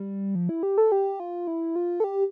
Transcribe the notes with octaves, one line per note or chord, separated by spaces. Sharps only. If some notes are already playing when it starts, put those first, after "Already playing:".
Already playing: G3
F3
E4
G4
A4
G4
F4
E4
F4
A4
G4